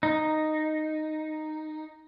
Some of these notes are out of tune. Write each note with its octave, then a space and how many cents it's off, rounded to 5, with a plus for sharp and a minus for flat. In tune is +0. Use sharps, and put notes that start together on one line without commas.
D#4 -5